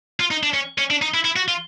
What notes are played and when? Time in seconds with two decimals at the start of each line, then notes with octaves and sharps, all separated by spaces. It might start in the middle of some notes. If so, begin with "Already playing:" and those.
0.20 F4
0.31 D#4
0.43 D4
0.54 C#4
0.78 C#4
0.90 D4
1.02 D#4
1.14 E4
1.25 E4
1.36 F#4
1.48 F4